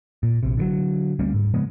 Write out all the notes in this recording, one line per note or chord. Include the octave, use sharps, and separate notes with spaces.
A#2
A#1 C3
D3 D#3 F#3
D2 G3 A#3 C#4
G#2
C#3 F3 G#3 B3